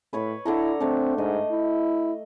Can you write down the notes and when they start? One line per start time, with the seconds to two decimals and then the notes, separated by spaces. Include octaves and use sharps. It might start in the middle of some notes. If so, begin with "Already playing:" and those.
0.13 A2 B4 C#5 B5
0.46 D3 E4 A4 A#5
0.80 A3 C4 D4
1.18 G#2 D#5
1.51 E4